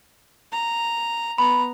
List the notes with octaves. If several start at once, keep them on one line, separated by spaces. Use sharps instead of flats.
A#5
B3 A#5 B5